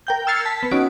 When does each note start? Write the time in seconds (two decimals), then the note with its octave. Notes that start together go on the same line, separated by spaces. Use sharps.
0.07 A#4 G5 G6
0.27 E6 F6 G#6 A6 C7 C#7
0.45 A5 B6
0.60 B3 B6
0.71 C#4 D#4 F#4 D7